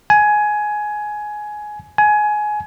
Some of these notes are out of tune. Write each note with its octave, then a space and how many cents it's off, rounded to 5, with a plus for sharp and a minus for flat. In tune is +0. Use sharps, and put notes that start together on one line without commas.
G#5 +15
G#5 +20